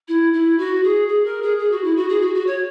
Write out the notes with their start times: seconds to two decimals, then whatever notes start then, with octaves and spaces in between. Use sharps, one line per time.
0.08 E4
0.33 E4
0.58 F#4
0.84 G#4
1.08 G#4
1.25 A#4
1.42 G#4
1.59 G#4
1.71 F#4
1.84 E4
1.97 F#4
2.09 G#4
2.21 F#4
2.34 F#4
2.47 C#5